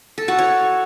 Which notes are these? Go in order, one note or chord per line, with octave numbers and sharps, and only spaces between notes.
A4
F#4
C#5